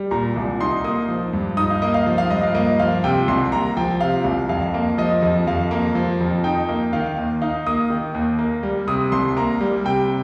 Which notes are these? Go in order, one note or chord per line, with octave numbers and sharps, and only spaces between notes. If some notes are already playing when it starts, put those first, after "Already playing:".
Already playing: G3
A#2 A#5
C2
D#4 C6
A#3 D#6
F3
G2
D#4 D#6
F5
A#3 D#5
F5
F3
F5
G2 D#5
F5
A#3 D#5
F3 F5
C3 G5
C2 C6
A#3 A#5
F3 G5
C3 F5
C2
F2 F5
A#3
F3 D#5
F2
F2 F5
A#3
F3
F2
D#4 G5
A#3
D#3 F5
D#2
D#4 F5
A#3 D#6
D#3
D#2
A#3
G3
C3 D#6
C2 C6
A#3 A#5
G3
C3 G5